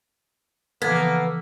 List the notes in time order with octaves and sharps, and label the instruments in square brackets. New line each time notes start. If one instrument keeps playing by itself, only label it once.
[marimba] C#3 E3 F3 [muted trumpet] A#3 [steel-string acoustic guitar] B3 [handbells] A4 B6